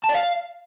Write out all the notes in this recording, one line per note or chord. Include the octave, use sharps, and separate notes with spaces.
A5
D5
F5